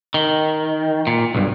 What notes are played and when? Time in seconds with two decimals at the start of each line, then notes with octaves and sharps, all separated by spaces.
0.14 D#3
1.07 A#2
1.35 B1 G2